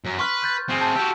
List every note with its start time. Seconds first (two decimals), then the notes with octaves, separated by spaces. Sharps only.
0.05 F#2
0.19 B4 C6 C#6 F6
0.42 F#6 G6 A6
0.69 C4 G#4
0.81 A5
0.96 F#4 G4 E6